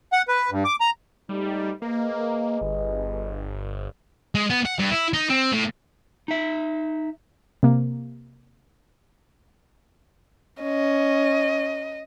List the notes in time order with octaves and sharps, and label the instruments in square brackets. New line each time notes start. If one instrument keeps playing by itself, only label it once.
[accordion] F#5
B4
G2
D6
A#5
[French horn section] G#2 A3 D#4 [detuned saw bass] G3
[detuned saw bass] A#3 [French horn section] G#4 B4 D#5
[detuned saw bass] G1
[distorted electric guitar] G#3
B3
F#5
G2
E4
D#4
C4
A2
[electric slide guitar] D#4 E5
[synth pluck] C3 A#3
[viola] C#4 [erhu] D#5